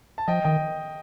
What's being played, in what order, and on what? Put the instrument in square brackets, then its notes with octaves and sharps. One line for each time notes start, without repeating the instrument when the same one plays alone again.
[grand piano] A5
[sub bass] F3 [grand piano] D#5 G5
[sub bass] D#3 [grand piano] D#5 G5